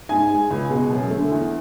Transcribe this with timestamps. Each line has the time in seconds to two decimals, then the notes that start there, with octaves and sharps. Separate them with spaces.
0.09 G#2 G#5
0.30 G#3
0.50 C#2
0.70 B2 G#3
0.91 F#2
1.10 A3
1.16 D3
1.31 E2